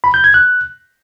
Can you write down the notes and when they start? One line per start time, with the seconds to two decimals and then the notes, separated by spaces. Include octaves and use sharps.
0.04 B5
0.14 G6
0.24 G#6
0.34 F#6